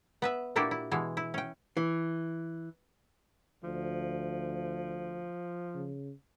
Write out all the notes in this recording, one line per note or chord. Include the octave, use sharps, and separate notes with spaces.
B3 B4 E5
A#2 A#3 D4 E4 F#4 G4
E4
B2 E3 G#3
E4
C#4 G5
E3
D2 F3
C#3